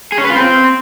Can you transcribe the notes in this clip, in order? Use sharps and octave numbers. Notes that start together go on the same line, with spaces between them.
G#4
C#4
B4
F4
C4